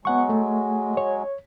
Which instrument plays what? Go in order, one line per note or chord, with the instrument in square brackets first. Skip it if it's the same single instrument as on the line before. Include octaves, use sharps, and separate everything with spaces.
[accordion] F#3 G#3 [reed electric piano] B3 F#5 C#6
[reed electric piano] A3
C#5